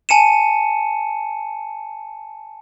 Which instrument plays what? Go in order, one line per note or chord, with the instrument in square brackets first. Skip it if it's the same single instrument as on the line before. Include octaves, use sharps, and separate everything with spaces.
[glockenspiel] G#5 A5 C#7 D#7 E7